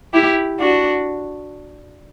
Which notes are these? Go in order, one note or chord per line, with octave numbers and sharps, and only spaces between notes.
E4 G4
D4 F#4